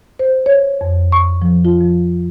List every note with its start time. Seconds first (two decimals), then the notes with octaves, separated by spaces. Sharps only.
0.19 C5
0.46 C#5
0.81 F2
1.12 C#6
1.42 F3
1.65 F4
1.81 F3